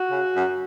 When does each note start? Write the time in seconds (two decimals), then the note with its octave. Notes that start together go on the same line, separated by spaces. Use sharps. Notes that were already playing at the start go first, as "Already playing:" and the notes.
Already playing: F#4
0.10 C#3
0.34 F#2